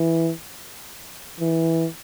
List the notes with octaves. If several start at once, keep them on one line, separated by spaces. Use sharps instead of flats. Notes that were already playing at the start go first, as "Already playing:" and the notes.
Already playing: E3
E3